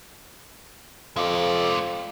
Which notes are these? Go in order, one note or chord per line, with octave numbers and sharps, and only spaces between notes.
F2 G#3 D5 F5